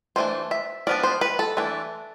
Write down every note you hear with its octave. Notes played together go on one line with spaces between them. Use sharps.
E3 A3 D4 C5
E5
F3 B3 D4 D5
C5
B4
A4
E3 A3 D4